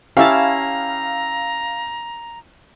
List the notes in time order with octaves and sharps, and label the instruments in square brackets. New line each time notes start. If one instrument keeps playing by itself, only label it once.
[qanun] C#4 E4 A5 [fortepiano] G4 E5 [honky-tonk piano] F5 [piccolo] A#5